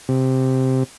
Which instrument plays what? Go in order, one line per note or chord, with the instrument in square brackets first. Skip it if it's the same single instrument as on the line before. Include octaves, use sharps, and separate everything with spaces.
[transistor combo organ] C3